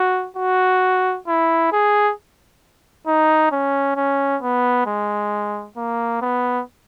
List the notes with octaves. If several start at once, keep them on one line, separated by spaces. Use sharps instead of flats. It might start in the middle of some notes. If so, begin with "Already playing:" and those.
Already playing: F#4
F#4
E4
G#4
D#4
C#4
C#4
B3
G#3
A#3
B3